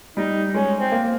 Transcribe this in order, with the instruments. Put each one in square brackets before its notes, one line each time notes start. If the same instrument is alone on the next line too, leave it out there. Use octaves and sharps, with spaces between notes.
[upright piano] G3 [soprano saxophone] D#4
[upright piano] G#3 [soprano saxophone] C#4
[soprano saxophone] C4
[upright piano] A#3